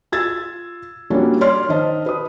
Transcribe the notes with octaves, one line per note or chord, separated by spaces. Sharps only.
F4 E6 G#6 A6
G3 A#3 C#4 D4 F4 F#4
C#5 D5 C6 F6
D#3 C5 D#5 A5 F6
B4 D#6